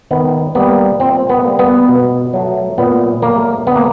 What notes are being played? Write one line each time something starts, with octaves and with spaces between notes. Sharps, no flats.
D#3 B3
G3 A#3 B3
A#2 C4
B3
G3 A#3
B3
B2
F#3 A3
A#2 B3
F#3 A3 A#3
D3 B3
A#3